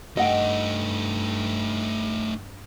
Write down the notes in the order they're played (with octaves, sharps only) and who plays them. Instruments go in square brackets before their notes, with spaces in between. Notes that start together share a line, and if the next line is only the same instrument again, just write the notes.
[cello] G2 [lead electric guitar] A3 D#4 [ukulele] D#5 F#5 G5